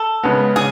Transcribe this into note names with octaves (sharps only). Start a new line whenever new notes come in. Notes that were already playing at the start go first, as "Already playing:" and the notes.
Already playing: A4
C#3 G#3 B3
C#3 G#4